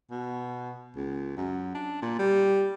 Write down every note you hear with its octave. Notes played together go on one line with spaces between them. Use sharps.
B2
C#2
F#2
D4
A#2
G3